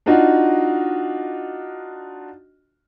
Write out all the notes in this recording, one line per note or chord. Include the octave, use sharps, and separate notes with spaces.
D4 D#4 F4 F#4 D#5